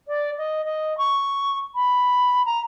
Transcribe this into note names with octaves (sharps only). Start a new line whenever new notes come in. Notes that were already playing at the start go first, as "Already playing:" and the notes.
D5
D#5
D#5
C#6
B5
A#5